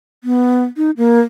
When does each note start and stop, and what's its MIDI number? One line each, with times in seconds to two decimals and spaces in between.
0.24 0.64 59
0.77 0.91 63
0.97 1.20 58